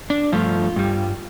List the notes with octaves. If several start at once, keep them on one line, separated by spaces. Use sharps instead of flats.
D4
G2 F3 A3 F4
G2 G3